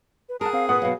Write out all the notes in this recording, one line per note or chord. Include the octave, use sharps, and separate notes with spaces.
B4
G#4 A#4 F#5 A5
C4 F5
A#2 B4 F#5 D#6
B2 F#3 F5